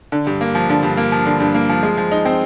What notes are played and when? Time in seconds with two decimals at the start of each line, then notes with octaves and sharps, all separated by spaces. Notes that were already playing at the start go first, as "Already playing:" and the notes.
0.12 D3
0.27 G2
0.41 A#3
0.55 F3
0.70 D3
0.83 G2
0.97 A#3
1.12 F3
1.26 D3
1.40 G2
1.55 A#3
1.69 F3
1.83 G#3
1.97 F3
2.12 D#4
2.25 C4